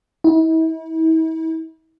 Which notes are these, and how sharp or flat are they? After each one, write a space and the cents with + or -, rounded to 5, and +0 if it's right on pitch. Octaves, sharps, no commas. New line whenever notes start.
E4 -40